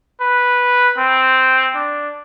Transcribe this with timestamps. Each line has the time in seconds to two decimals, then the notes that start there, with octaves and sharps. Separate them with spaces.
0.21 B4
0.98 C4
1.75 D4